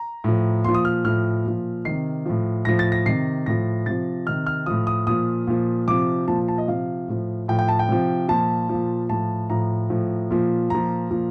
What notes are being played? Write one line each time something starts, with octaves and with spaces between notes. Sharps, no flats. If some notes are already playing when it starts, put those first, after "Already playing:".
Already playing: A#5
A2 F3
A#2 F3 C6
D#6
F6
A2 F3 F6
A#2 F3
C3 D#3 C7
A2 F3
A2 F3 A#6
A6
A#6
C3 D#3 C7
A2 F3 A#6
C3 F3 A6
C3 D#3 F6
F6
A2 F3 D#6
D#6
A#2 F3 D#6
A#2 F3
C3 F3 D6
A#2 F3 A5
A5
D#5
C3 F3 F5
A2 F3
A2 F3 G5
G5
A5
G5
C3 F3
A#2 F3 A5
A#2 F3
A2 F3 A5
A2 F3 A#5
A2 F3
A#2 F3
A#2 F3 A#5
A#2 F3